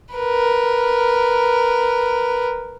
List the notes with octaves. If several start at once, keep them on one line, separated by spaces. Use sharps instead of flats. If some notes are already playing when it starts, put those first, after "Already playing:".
A#4 B4